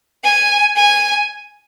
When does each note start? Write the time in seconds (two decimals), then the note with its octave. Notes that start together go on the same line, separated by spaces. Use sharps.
0.24 G#5
0.76 G#5